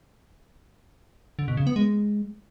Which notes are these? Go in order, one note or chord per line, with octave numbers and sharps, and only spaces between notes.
D3
B2
C#3
B3
G#3